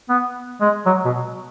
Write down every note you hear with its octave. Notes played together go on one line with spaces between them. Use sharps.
B3
G#3
F#3
B2